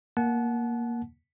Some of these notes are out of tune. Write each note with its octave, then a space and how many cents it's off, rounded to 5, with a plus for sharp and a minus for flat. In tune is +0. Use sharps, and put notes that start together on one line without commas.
A#3 +10 F#5 +0 A5 -35